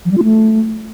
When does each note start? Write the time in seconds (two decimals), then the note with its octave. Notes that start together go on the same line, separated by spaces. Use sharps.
0.05 F3
0.11 G3
0.17 F4
0.24 A3